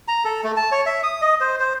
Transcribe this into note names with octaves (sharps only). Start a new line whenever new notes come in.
A#5
A4
A3
A5
C#5
E5
D#6
D#5
C5
C5